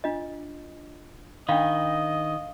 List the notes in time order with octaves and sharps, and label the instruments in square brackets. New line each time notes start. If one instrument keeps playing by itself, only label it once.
[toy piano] D4 F4 D#5
[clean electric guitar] D#3 [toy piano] D4 G5 B5 [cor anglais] D#5 [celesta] F5